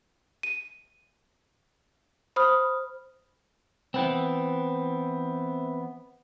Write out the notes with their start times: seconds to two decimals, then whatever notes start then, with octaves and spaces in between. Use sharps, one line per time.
0.43 D#7
2.36 C5 B5 D#6 F6
3.94 E3 B3 C4